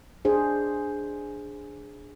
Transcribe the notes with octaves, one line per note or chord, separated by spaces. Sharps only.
D4 G#4 C5